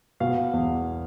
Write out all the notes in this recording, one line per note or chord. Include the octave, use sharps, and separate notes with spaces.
B2 F5
E2